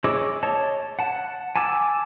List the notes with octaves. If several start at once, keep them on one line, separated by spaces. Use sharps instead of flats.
G#4 C#5 D#5 D6 E6
C#5 D#5 A5
F#5 A5
G#5 A5 D6 E6